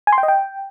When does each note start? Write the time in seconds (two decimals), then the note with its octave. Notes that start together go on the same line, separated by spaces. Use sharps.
0.07 G#5
0.13 C6
0.18 G5
0.23 D#5
0.28 G5